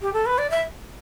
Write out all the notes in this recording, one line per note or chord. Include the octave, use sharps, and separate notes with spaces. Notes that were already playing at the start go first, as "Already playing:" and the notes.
G4
A4
B4
D5
E5